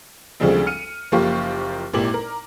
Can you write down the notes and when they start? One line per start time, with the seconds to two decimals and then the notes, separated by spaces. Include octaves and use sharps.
0.40 D2 C#3 F3 G3 G#3 C4
0.66 F6 C#7 D#7
1.12 F#1 F3 A#3 G4 F5 C#6
1.93 G#1 A#2 E4 G4 D6 F#7
2.14 A#4